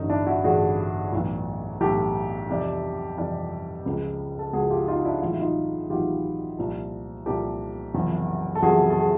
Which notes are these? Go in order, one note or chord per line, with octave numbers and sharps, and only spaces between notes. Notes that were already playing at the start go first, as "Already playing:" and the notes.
Already playing: A1 G2 D3 C#4 D#4
D4 E4
E4 F#4
A1 G2 D3 F#4 G#4
B1 A2 E3
B1 A2 E3 G4 A4
F2 C3 E3 G3
F2 C3 E3 G3
C#2 C#3 F3
A4
C#2 C#3 F3 F#4 G#4
F4 G4
D#4 F4
D4 E4
A1 G#2 D#3 F#3 F4
E4
D#4 F4
A1 G#2 D#3 F#3 F4 G4
C2 A#2 F3
C2 A#2 F3 G4 A4
F#1 E2 C3 F3
A4
F#1 E2 C3 F3 F#4 G#4
A4
G#4